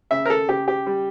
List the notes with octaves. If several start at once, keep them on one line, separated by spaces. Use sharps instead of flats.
C#3 E5
A#4
A4
C#3 G4
G4
G3